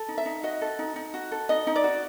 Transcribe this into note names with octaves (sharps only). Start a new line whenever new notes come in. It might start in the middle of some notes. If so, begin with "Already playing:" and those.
Already playing: A4
D#4
E5
D#4
F#4 D#5
A4
D#4
D#4
F#4
A4
D#4 D#5
D#4
D5
F#4